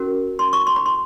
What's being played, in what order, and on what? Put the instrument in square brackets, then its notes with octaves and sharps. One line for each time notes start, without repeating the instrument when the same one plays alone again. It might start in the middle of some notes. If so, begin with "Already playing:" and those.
Already playing: [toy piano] C#4 F#4 A#4
C6
C#6
C6
B5
C6